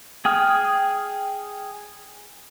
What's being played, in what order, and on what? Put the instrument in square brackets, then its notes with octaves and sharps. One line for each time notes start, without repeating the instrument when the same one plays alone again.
[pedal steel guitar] G#4 G5 D#6 F6